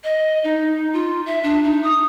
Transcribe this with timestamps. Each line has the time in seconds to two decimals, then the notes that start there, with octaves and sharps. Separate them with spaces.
0.04 D#5
0.44 D#4
0.93 F4
1.26 E5
1.43 D4
1.63 D#4
1.83 D#6